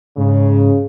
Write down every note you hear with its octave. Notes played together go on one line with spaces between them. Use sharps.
G#2 C#3